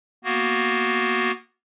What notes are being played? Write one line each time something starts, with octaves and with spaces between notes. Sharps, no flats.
A#3 B3 F#4